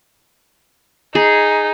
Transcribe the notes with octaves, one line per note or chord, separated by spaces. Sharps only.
D#4 G#4